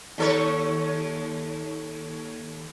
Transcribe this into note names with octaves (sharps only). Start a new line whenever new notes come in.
D#2 A4 C#5